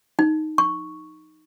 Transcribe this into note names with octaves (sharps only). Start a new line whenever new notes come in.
D#4
C#6